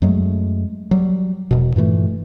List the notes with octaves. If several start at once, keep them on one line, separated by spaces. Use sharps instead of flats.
F#2 F#3 G#3 A3
F#3 G3
E1 B2
G2 A#2 E3 A3